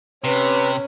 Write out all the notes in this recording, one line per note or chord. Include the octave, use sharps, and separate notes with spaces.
C3 C#4 B4